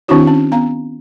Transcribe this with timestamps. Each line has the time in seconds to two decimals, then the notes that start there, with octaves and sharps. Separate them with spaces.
0.08 D#3 C4 D4 E4 F#4 C#5
0.27 C#4
0.52 B3 F5 A#5